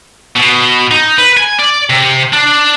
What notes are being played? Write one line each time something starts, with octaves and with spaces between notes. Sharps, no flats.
B2
D#4
B4
G#5
D5
C3
D4